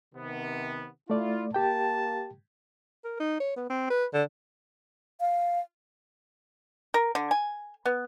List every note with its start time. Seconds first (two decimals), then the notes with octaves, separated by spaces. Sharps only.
0.14 C3 D#3 B3
1.10 A3 E4 F4 D5
1.54 A#3 G4 G5 A5
3.04 A#4
3.20 D#4
3.40 C#5
3.56 B3
3.70 C4
3.90 B4
4.14 D3
5.20 F5
6.94 A#4
7.15 D3
7.31 G#5
7.86 B3